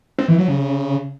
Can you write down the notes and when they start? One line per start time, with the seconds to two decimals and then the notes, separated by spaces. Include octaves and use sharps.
0.19 C4
0.28 E3
0.38 F#3
0.48 C#3